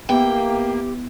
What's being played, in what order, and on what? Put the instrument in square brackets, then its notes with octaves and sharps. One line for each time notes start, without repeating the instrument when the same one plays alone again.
[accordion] A#3 [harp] B3 E4 [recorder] G4 [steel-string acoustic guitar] G5